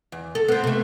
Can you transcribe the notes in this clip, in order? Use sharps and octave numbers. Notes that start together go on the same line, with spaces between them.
E2
A4
B3 C4
C3 A3